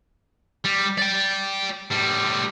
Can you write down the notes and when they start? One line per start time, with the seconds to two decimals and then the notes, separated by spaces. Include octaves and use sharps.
0.65 G3
0.98 D5 G5
1.92 A2 G3